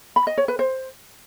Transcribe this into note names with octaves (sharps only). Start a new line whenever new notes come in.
B5
D#5
C#5
B4
C5